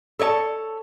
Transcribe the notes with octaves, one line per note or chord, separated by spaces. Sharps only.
A4 C#5 D5 A5